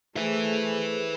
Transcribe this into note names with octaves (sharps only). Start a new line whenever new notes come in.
A3 G#4 A4 B4 C5 E5